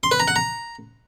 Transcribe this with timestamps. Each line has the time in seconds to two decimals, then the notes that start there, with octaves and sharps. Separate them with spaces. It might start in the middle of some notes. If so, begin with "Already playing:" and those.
0.03 C6
0.11 B4
0.20 A#5
0.28 F#5
0.36 A#5